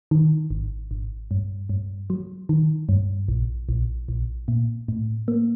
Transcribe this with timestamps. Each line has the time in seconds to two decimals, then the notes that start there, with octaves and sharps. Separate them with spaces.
0.11 D#3
0.51 G#1
0.91 G#1
1.31 G2
1.69 G2
2.10 F#3
2.49 D#3
2.89 G2
3.28 A#1
3.69 A#1
4.09 A#1
4.48 A#2
4.88 A2
5.28 A#3